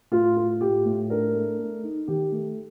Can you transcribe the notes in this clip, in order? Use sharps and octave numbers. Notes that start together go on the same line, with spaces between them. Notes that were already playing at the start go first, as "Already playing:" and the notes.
A2 F4
F4
A2 G4
A2
D4 A#4
A3
A3
D#4
D#3 G4
A3